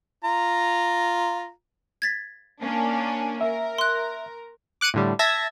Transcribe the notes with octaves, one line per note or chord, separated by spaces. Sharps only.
F4 A#5
G#6 A6 B6
A#3 C#4 D4
A#4 E5
C6 F#6
D6 F#6 C#7 D#7
A2 D3 G3
E5 A5 G#6 A#6